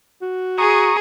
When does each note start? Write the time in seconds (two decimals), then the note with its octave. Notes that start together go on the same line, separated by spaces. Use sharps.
0.21 F#4
0.58 G#4 A#5 C#6 D#6